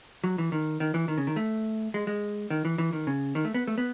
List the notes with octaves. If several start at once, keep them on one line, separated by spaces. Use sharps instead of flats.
F#3
E3
D#3
D#3
E3
D#3
C#3
D#3
A3
G#3
G#3
D#3
E3
E3
D#3
C#3
D#3
A3
B3
A3
B3